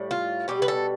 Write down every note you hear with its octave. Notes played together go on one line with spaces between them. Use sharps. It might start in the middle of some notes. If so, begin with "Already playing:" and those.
Already playing: A2 G3
F4
B2 G3 G4
B4
A4